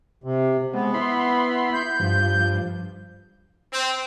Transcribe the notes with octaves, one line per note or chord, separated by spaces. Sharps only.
C3
G#3 B3 C4
E4 B5 C6
G6
G2 F3
C4